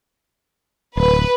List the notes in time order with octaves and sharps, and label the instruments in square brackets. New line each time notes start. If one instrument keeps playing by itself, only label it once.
[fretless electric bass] D1 [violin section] B4